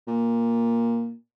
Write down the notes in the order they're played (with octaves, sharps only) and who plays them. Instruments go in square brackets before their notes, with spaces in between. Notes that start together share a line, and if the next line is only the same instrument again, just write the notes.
[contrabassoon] A#2